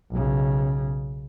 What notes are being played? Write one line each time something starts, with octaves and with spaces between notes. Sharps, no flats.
B1 C#3